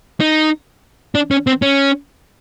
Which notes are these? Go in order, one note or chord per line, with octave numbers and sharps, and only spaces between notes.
D#4
D4
C#4
C4
C#4